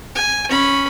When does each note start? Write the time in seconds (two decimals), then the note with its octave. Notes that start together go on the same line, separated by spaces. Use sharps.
0.15 G#5
0.49 C#4 B5